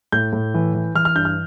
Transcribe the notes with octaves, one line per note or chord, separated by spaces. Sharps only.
A2 G6
A2
E3
E3
E3 F6
F6
G2 G6
F6